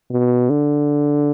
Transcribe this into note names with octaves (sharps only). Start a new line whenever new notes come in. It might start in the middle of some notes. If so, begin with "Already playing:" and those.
B2
D3